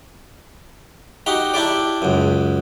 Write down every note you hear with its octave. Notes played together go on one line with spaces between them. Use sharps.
D#4 F#4 G4
D4 E4 G4 D5
C#2 F#2